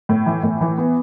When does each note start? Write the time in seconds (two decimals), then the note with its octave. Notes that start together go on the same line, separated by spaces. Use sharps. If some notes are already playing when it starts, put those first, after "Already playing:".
0.09 A2
0.26 E3
0.43 A2
0.61 E3
0.78 B3